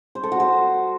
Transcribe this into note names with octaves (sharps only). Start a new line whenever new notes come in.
C5
A4
F#4
C5